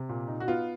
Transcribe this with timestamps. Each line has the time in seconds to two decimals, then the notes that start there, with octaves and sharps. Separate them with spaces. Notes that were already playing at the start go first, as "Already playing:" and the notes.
Already playing: C3
0.09 A#2
0.28 D#4
0.40 F#4
0.48 B3 F4